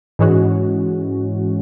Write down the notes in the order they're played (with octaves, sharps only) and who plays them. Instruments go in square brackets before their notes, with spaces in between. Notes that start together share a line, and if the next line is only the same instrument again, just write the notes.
[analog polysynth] G#2 E3 G#3 C#4 F#4